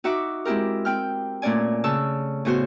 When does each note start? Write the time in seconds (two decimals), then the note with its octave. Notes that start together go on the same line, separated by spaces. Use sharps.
0.04 D#4 F#4 E5 F#5 D6
0.45 G#3 C4 E4 G4 A#4
0.85 C4 G5 F6
1.42 A#2 A3 C#4 D5 G#5
1.84 C#3 A5 C#6 E6
2.45 A2 C#3 B3 F#4 C5